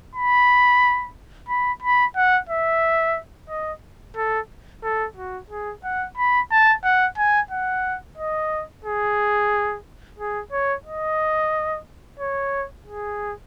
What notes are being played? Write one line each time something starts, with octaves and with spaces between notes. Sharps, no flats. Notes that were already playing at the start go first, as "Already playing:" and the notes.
B5
B5
B5
F#5
E5
D#5
A4
A4
F#4
G#4
F#5
B5
A5
F#5
G#5
F#5
D#5
G#4
G#4
C#5
D#5
C#5
G#4